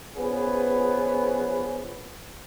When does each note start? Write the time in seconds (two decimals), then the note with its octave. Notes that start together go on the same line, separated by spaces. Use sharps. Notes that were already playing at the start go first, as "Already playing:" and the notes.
0.16 A#1 F3 B3 C#4 G#4 B4